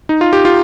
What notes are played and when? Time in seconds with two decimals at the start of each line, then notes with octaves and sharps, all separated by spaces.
0.09 D#4
0.21 F4
0.33 G4
0.45 F4